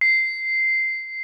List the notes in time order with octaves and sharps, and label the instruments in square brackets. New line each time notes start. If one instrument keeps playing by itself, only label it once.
[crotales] C7